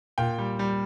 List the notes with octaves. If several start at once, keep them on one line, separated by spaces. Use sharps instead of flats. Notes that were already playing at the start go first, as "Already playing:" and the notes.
A#2 G5
G3
G3